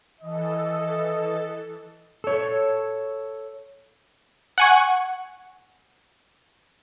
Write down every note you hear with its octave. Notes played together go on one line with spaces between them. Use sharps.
E3 A4 D#5
A4 C#5
F#5 G#5 C#6